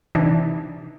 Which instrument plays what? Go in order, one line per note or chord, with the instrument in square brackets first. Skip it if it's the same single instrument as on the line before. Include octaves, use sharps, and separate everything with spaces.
[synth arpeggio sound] C3 E3 D4 D#4